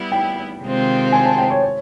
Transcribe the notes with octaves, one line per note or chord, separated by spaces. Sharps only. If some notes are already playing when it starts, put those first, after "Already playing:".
Already playing: G3 B3 E4
G5
C3 D#3 G#3 C4 F4
G#5
A5
G5
C#5
C#5